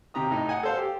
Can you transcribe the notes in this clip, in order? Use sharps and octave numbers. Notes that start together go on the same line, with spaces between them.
D#2 C3 G4 A#5 D#6
A2 D#4
F#5 G#5
A4 C5 F5
G4